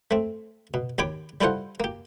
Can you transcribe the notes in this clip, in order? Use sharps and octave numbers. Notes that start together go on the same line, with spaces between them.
A3 C4
B2
D#2 G4 C#5 B5 D6
G3 E4 F4 A4 C5 F#5
A#3 G4